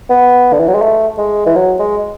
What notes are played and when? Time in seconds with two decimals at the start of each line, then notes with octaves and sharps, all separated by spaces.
0.10 B3
0.53 D3
0.60 E3
0.68 F#3
0.75 G#3
0.82 A3
1.18 G#3
1.46 E3
1.56 F#3
1.79 G#3